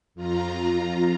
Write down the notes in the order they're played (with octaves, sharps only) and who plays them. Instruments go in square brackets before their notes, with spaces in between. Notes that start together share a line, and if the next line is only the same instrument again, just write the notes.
[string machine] F2 F4 A#5